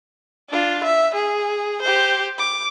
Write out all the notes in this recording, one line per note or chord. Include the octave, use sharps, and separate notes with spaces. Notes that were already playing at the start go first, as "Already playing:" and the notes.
D4 F4
E5
G#4
G4 C5
D6